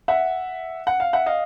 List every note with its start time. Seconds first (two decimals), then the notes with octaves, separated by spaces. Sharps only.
0.08 E5 F#5
0.87 F#5
1.00 F5
1.13 E5 F#5
1.26 D#5 F5